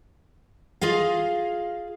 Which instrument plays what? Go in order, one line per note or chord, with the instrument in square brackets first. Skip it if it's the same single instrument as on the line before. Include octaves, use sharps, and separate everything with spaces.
[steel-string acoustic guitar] F4 G#4 D#5 F5